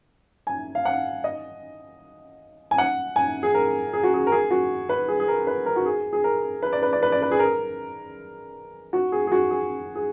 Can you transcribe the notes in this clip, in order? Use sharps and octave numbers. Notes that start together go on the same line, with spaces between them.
G#5
F5
F#5
D#5
G#5
F#5
G#5
G#4
A#4
G#4
F#4
G#4
A#4
G#4
F#4
B4
G#4
G#4
A#4
B4
A#4
F#4
G#4
G#4
A#4
B4
D5
B4
D5
B4
D5
B4
G#4
A#4
F#4
G#4
G#4
F#4
G#4
G#4